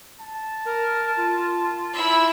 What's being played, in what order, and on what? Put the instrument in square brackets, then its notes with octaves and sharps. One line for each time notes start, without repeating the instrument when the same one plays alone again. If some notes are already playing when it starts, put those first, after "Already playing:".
[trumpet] A5
[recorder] A#4
F4
[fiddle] E4 E5